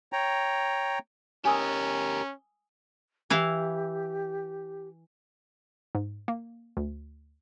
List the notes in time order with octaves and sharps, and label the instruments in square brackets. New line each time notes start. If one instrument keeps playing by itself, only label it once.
[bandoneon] C#5 G5 A#5
[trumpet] C#4 [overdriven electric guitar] G4 A#4 [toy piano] G#5 D#6 E6
[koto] E3 E4 F5 [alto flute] G4
[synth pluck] G#2
A#3
D2